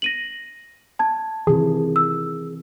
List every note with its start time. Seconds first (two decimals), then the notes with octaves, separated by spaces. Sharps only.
0.02 A#6 D#7 F#7
0.99 A5 G#6
1.47 C3 D#3 E3 G#4
1.96 E6